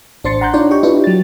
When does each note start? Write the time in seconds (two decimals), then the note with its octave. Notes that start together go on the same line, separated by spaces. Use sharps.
0.24 A1 D4 C5 C6 A6 C#7
0.41 F#5 A#5 C6 F#6 G6
0.54 D4 D#4 F4 C#5 D5
0.71 G4 D#5 G5 C#6
0.83 D4 E4 F4 G4 B4
1.04 F#3 A6